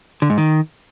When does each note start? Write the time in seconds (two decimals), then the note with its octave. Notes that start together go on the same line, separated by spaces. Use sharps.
0.22 D3
0.30 G#2
0.38 D#3